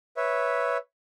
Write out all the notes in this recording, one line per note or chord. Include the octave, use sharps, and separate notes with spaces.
B4 C#5 E5